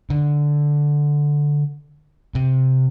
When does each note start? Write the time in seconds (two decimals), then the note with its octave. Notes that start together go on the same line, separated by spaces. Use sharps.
0.10 D3
2.35 C3